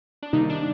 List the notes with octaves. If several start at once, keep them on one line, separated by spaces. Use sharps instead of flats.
D4
C3 D#3 G3 A#3 D#4
D4